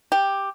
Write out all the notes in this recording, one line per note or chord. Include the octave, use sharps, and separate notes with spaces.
G4